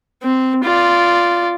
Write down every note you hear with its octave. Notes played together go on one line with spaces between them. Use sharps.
C4
F4 D5